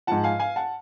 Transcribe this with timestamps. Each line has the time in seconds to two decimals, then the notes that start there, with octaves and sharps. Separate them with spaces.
0.07 G#2 F3 F#5 A5
0.24 F5 G#5
0.40 F5 G#5
0.56 F#5 A5